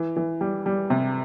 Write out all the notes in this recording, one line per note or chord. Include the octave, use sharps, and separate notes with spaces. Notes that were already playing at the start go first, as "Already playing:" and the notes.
Already playing: E3
E3
G3
G3
C3